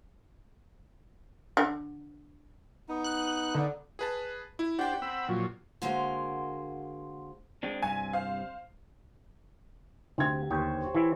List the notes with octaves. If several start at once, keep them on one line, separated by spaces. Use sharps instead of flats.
D3
B3 D#4
F#6
D3
G#4 B4 A5
E4
D4 G4 C5 F#5 G5
C4 B5 E6
A#2 F3 F#3
D3 G#3 A#3 F#4 A#4 C5
G#3 C4 D4
G2 C3 G#5
C5 F5
D2 C4 G4 G#6
D#2 G4 C5 C#5
E3 E4